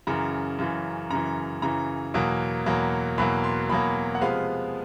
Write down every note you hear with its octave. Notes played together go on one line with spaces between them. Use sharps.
F#2 C#3 E3 A#5
F#2 C#3 E3
F#2 C#3 E3 A#5
F#2 C#3 E3 A#5
E2 B2 F#3 A#3
E2 B2 F#3 A#3
E2 B2 F#3 A#3 B5
C6
E2 B2 F#3 A#3 B5
F#5
C3 F3 G#3 B3 F5